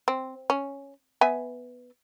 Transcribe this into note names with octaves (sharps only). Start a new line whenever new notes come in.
C4
C#4
B3 E5 G#5